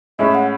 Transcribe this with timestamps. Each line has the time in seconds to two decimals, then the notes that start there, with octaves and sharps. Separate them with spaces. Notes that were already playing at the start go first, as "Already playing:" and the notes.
0.19 A2 G#3 C#4 E5
0.35 F#5